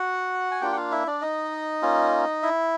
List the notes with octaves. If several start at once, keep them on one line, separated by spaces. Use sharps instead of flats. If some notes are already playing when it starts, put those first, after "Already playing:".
Already playing: F#4 F#5
G#5
A#3 D4 F4 G4 G5
F#5
F4 F5
E4 E5
D4 D5
D#4 D#5
A#3 C#4 F4
E4 E5